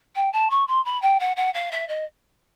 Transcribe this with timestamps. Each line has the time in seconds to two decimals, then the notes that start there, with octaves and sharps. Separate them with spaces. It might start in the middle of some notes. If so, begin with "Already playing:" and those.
0.16 G5
0.33 A5
0.50 C#6
0.68 C6
0.85 B5
1.02 G5
1.20 F#5
1.37 F#5
1.54 F5
1.72 E5
1.88 D#5